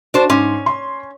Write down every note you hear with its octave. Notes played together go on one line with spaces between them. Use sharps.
D4 F#4 C5
G#2 C#4 C6 D6
C6